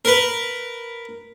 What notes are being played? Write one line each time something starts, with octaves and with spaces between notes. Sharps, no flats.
A#4 B4